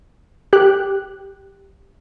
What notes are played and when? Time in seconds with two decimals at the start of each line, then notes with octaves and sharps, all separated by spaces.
0.53 G4 F#6